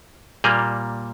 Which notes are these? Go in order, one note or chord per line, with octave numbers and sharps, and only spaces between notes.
A#2 G3 A#3 G#4